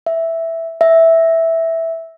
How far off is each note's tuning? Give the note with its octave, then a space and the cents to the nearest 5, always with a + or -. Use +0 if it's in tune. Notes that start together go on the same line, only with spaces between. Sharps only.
E5 +0
E5 -5